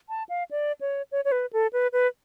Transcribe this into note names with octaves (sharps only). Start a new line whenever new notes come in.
A5
F5
D5
C#5
C#5
C#5
B4
A4
B4
B4